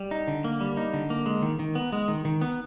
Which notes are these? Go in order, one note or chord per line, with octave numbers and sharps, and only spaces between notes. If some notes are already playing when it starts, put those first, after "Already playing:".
Already playing: G3
D#4
D3
A#3
G3
D#4
D3
A#3
G#3
D#3
D#3
B3
G#3
D#3
D#3
B3